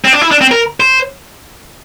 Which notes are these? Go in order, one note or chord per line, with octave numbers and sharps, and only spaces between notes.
C4
D4
E4
D4
C4
A#4
C5